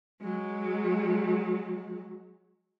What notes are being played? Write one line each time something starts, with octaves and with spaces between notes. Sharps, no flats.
F#3 G#3